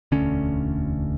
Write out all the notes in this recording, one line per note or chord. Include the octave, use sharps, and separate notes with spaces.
E1 D2 D3 C#4